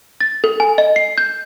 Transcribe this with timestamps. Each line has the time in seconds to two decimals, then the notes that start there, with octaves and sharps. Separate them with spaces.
0.21 A6
0.44 A4
0.60 G#5
0.78 D#5
0.96 C7
1.18 G6